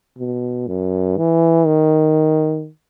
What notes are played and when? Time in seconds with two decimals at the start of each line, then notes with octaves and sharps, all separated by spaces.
0.19 B2
0.67 F#2
1.18 E3
1.66 D#3